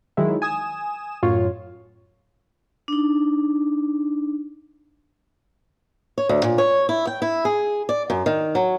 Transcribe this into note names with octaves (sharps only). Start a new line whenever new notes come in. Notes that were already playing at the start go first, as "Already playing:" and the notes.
D#3 F#3 G#3 E4
G#5 D#6 E7
F#2 A2 F4 C#5
D4 D#4
C#5
D2
A#2
C#5
E4
G5
E4
G#4
D5
F#2
D#3
F#3